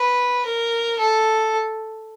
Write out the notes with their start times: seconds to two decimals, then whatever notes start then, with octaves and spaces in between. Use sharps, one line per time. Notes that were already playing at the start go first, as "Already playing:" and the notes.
Already playing: B4
0.45 A#4
0.99 A4